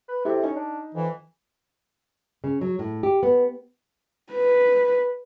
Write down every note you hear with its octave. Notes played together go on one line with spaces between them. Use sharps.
B4
C3 E4 G4 A4
C#4 D#4
D4
F2 E3
C#3
F#3
A2
G4
B3
B4